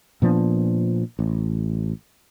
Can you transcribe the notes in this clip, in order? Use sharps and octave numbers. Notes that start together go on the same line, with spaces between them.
A#2 F3 B3 D4
A1